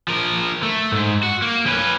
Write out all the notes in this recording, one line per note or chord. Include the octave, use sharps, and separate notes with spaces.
F3 A#4
A3
G#2
F#4
A#3
C#4 B4